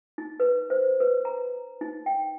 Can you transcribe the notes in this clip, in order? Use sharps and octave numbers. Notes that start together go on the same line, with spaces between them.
D#4
B4
C5
B4
A#5
D#4
G5